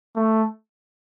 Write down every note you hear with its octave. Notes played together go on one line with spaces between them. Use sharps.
A3